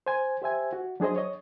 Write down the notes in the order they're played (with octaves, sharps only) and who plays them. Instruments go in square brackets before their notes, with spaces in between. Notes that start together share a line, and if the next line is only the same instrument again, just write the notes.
[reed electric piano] C5 G#5
G4 C5 E5 G#5
F#4
F#3 D4 G#4 C5 D#5
C#5 D#5